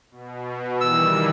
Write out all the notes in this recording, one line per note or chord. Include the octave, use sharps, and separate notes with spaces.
B2
D#3 E3 G3 E6